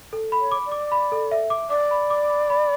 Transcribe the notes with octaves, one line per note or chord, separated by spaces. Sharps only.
A4
B5
C#5
D6
D5
D6
B5
A4
E5
D6
D5 D6
B5
D6
B5
B5